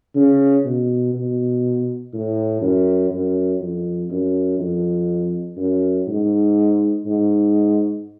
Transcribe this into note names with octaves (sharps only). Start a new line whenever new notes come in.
C#3
B2
B2
A2
F#2
F#2
F2
F#2
F2
F#2
G#2
G#2